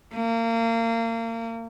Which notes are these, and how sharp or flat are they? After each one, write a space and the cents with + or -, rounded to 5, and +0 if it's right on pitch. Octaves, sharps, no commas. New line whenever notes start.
A#3 -30